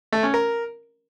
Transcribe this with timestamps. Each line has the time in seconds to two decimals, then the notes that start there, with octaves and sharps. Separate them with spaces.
0.12 A3
0.23 C#4
0.34 A#4